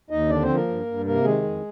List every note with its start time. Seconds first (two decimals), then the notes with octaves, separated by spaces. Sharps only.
0.10 D#2 D#4 D#5
0.29 D3 D4 D5
0.42 C4 C5
0.49 F3
0.55 A#3 A#4
0.68 G2
0.86 G2
1.05 C3 A#3 A#4
1.24 D#3 G#3 G#4
1.43 F2